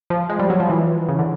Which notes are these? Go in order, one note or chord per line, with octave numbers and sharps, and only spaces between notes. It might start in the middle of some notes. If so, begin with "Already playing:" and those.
F3
G#3
G3
F#3
F3
E3
C#3
D3